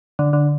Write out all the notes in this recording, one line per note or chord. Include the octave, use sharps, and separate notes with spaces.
D3
D3